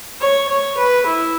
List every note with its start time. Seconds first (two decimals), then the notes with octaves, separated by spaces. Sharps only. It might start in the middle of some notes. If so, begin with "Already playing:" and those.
0.21 C#5
0.49 C#5
0.78 B4
1.06 E4